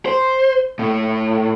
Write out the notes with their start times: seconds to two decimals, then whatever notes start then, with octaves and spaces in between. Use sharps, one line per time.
0.06 C5
0.79 A2